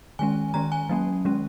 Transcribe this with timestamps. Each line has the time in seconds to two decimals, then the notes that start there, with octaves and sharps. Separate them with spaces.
0.19 D#3 G#3 C#4 G#5
0.54 D#3 G#3 C#4 A#5
0.72 G#5
0.89 F#3 A#3 C#4
1.25 D#3 G#3 C#4